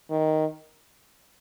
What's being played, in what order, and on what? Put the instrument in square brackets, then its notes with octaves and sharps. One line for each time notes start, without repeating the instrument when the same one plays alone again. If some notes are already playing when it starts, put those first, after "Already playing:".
[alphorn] D#3